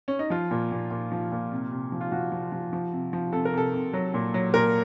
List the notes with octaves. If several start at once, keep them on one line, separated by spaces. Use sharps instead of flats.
C#4
D#4
F3 F4
A#2
A#2
A#2
F3
A#2
C3
C3
F3
F4
F3 F#4
F3
F3
F3
C3
F3
C3 A4
A#4
C3 A4
C3
F#3
A#2
F#3
A#2 A#4